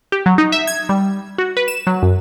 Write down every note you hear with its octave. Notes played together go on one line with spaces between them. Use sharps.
G4
F#3
D#4
E5
G#6
G3
F#4
B4
E7
F#3
F#2